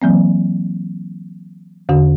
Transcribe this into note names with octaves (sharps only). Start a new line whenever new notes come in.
E3 F#3 A#3 C4
E2 D3 F#4